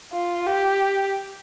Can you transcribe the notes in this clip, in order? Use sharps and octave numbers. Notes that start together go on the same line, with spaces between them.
F4
G4